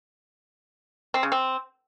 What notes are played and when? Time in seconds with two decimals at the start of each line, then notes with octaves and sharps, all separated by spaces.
1.14 C4
1.23 C#3
1.32 C4